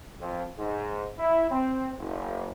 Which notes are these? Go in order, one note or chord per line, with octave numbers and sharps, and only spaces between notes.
F2
G#2
E4
C4
F#1